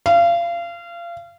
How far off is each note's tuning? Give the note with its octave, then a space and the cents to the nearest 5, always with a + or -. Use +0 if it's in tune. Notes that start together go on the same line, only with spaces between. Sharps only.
F5 -30